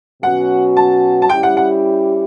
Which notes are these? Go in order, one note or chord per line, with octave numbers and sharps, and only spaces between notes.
B2 F#3 C#4 F#4 F#5
A5
A5
G3 C#4 E4 G4 G5
F#5
F#5